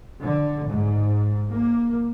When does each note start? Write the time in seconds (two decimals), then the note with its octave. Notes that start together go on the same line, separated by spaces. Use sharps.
0.23 D3
0.67 G#2
1.51 A#3